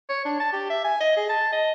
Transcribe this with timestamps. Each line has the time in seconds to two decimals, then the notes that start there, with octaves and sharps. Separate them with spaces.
0.09 C#5
0.25 D4
0.40 A5
0.53 G4
0.70 E5
0.84 G#5
1.00 D#5
1.17 G#4
1.29 A5
1.53 D#5